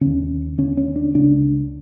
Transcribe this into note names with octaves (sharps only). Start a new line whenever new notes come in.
D#2 D3 C#4
D#2 D3 C#4
C#4
D4
C#3 D4
C#2